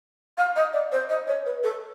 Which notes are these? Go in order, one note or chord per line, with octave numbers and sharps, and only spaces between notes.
F5
D#5
D5
C5
D#5
C#5
B4
A4